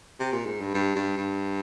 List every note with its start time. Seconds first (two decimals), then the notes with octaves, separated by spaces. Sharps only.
0.20 C3
0.32 A#2
0.46 G#2
0.60 G2
0.74 G2
0.96 G2
1.17 G2